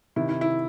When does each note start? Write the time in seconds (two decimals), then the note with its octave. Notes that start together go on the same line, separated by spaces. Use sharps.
0.16 C3 D#3 E4
0.29 E4
0.41 E4